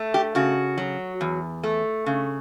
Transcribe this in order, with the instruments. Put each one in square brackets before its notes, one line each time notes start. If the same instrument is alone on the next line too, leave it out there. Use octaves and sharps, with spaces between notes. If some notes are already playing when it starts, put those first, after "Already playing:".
Already playing: [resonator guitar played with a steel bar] A3
G4
C#3 F#4
F#3
E2
A3
C#3